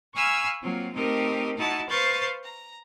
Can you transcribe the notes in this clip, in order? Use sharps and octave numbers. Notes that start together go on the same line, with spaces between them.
F5 G#5 B5 C#6 E6 F6
F#3 A#3 C4 F4
A3 C4 D#4 G4 A#4
D#4 E4 F#4 A5
B4 C5 F5 C#6 G6 A6
A#5